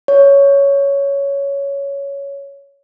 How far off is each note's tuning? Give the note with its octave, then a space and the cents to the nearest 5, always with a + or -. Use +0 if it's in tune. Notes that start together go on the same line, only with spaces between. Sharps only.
C#5 +10